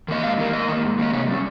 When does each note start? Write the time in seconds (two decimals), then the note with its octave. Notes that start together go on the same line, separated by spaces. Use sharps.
0.08 D#3 A#3 D#5
0.23 G#2 F5
0.38 D#3 A#3
0.53 G#2 D#5
0.68 D#3 A#3
0.83 G#2
0.98 D#3 A#3 D#5
1.13 C3 C#5
1.28 G3 C#4